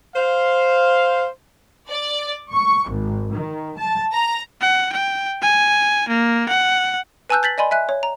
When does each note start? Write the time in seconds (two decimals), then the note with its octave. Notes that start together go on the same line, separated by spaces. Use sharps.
0.16 C5 F5
1.89 D5
2.50 C#6
2.90 G#1
3.32 D#3
3.77 A5
4.13 A#5
4.61 F#5
4.92 G5
5.42 G#5
6.08 A#3
6.48 F#5
7.30 B4 G#5 A5 E6 F#6 G6
7.43 G6 A6 B6 F#7
7.58 D5 D#5 G#5 B5 C6
7.71 E5 G#5 F#6
7.89 C#5
8.03 A#5